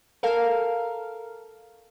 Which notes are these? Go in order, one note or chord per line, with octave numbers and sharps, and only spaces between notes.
A4 A#4 F5